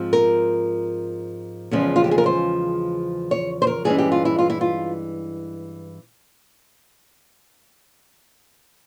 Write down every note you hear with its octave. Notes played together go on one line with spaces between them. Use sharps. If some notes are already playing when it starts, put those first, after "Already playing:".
Already playing: G#2 F3 C4
A#4
E2 C#3 F3 G#3 C#4
F4
G4
G#4
A#4
C5
C#5
C5
A#4
G2 E3 G#3 C#4 G#4
G4
F4
E4
F4
E4
F4